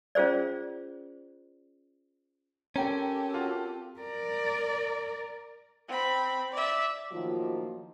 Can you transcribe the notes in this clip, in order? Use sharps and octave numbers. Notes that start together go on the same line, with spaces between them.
C#4 F4 G#4 C5 D5
C4 C#4 G4 A4 A#4 G5 A#5
F4 F#4
A#4 D5
C4 B5
D5 E5
A2 D#3 F3 F#3 A#3 F4